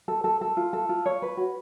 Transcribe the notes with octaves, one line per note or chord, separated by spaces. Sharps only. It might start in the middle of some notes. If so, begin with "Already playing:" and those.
A4
A4
A4
F4
A4
F4
C#5
B4
F#4